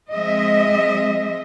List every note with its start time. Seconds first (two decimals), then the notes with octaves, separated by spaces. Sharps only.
0.12 F3 G#3 C4 D#5 E5